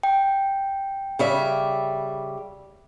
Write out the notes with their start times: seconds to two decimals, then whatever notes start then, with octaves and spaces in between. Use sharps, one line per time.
0.03 G5
1.19 C#3 G3 E5